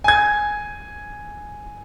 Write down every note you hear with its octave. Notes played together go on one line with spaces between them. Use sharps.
G#5 G#6